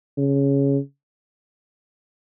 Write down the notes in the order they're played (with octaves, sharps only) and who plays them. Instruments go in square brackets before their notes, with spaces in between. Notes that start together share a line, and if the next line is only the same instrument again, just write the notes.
[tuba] C#3